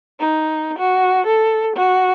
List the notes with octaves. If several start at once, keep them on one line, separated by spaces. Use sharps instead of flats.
D#4
F#4
A4
F#4